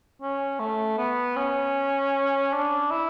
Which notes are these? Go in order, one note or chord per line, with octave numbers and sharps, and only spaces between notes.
C#4
A3
B3
C#4
D4
E4